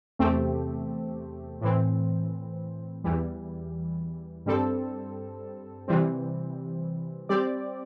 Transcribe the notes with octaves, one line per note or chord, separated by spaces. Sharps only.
E2 C3 A3 C4 G4
A2 E3 C4
E2 E3 G3
G2 G3 C4 A4
C3 E3 G3 C4
G3 C4 G4 D5